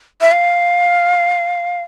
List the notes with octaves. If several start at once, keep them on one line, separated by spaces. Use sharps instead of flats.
E5
F5